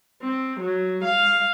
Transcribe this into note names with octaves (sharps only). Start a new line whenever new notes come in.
C4
F#3
F5